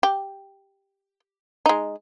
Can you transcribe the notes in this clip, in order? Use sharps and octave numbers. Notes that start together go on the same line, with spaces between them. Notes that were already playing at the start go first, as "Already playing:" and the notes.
G4
G#3 D#4